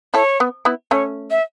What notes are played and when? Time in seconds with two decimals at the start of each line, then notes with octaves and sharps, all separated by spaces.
0.14 E4 A4 C#5
0.40 B3
0.65 B3 E4
0.91 A3 C#4 C#5
1.31 E5